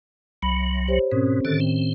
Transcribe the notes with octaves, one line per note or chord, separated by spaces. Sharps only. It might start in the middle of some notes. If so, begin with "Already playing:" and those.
C2 F#3 B5
G4 C5 C#5
G#2 B2 C4 C#4 A#4
A2 D3 D#3 A4
C4